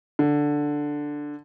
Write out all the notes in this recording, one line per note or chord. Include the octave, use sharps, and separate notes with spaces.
D3